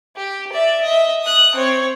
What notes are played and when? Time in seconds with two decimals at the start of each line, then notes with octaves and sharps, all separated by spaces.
0.17 G4
0.53 D5 E5
0.83 D#5 E5
1.22 D#6 F#6
1.55 C4 C#5